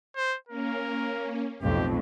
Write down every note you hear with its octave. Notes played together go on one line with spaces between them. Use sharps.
C5
A#3 C#4 A#4
B1 F2 A2 G4